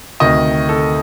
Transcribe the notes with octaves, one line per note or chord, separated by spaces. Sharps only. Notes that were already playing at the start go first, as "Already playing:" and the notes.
D2 C3 D#3 D#5
A4